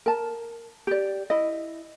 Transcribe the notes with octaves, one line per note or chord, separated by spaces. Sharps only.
A#4 A5
G4 D5
E4 D#5